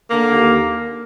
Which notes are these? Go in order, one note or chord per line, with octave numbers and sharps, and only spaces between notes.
D3 A#3
D#2